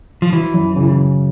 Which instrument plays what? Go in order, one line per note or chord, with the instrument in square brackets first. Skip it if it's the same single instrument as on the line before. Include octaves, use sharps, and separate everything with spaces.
[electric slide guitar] F3
[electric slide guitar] E3 [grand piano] F#3
[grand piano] F#2
C#3